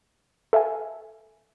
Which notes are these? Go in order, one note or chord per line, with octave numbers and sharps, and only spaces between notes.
A4 E5 F5 G#5